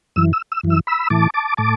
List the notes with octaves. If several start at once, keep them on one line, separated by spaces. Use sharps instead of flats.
F#2 E3 E6
E6
E6
F#2 E3
E6
B5 E6
A2 E3 A5 D6
A5 D6
A2 A5 D6